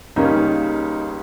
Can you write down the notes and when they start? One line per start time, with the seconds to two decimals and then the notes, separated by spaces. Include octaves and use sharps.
0.16 C#2 C#3 G3 A#3 C#4 D#4